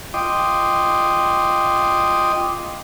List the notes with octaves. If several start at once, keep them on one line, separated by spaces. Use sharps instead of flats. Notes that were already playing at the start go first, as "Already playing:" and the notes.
F4 D#5 G5 C6 D6 D#6